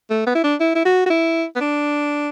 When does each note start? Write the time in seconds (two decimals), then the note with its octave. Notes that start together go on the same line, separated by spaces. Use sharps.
0.11 A3
0.27 B3
0.35 E4
0.44 D4
0.61 E4
0.76 E4
0.85 F#4
1.06 F#4
1.11 E4
1.56 B3
1.61 D4